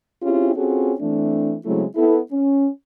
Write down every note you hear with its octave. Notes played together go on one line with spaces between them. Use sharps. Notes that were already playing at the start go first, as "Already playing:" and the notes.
C4 C#4 E4 F4 G4 G#4
C4 C#4 F4 F#4 G#4 A4
E3 A3 C4 D4
C#3 F#3 G#3 A3 C4 E4
B3 E4 A4
C#4